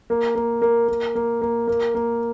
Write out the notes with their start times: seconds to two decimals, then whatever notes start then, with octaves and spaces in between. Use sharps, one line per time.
0.10 A#3
0.35 A#3
0.62 A#3
0.88 A#3
1.15 A#3
1.41 A#3
1.67 A#3
1.94 A#3